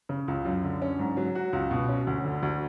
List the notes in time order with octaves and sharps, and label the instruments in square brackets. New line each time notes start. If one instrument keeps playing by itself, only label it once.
[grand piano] C#3
C#2
F#2
D3
C#4
G#2
F#3
F#4
C#2
B2
C#4
D2
D3
D2